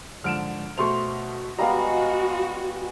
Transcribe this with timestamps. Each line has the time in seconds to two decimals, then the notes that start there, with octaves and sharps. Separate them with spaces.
0.24 G#2 D3 F3 F6 D7 E7
0.78 B2 A3 C5 C6 C#6 F7
1.59 G3 G#3 B3 F#4 D#5 F5 F#5 A#5